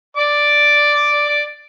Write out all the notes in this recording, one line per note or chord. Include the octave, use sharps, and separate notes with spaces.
D5 D6